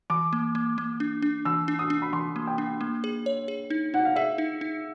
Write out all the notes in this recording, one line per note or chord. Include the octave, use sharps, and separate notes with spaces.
E3 D6
A#3
A#3
A#3
D4
D4
E3 E6
D4
D#6
D4
B5
E3 C6
A#3
G5
D4
A#3
G#4
C#5
G#4
D#4
D#4 F#5
F5
G#4 E5
D#4
D#4